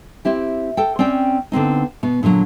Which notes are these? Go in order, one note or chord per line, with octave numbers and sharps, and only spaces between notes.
C4 E4 G4
A4 G5
C4 C#4 D5 G5
D3 B3 C4 D#4
B2 B3
A#2 D3 E3 F#3